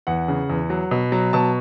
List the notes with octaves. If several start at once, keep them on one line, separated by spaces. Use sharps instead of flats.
E2 F#5
C#3
E2
F#3
B2
F#3
B2 A5